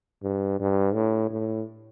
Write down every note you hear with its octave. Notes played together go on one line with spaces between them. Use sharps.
G2
G2
A2
A2